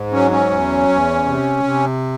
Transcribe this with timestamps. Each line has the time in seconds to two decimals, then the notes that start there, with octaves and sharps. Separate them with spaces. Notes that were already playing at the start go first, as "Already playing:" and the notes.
Already playing: G#2
0.12 F#3 C#4
0.31 C#4
0.50 E2
0.89 E2
1.26 C3
1.64 C3